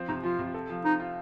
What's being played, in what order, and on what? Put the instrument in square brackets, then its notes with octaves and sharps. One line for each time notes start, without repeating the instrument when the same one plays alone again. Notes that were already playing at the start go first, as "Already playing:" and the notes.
Already playing: [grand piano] F3 C4
[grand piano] C3 [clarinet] D#4
[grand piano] F3 [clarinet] F4
[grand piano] C3
A4
F3
[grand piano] C4 [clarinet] D#4
[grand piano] F4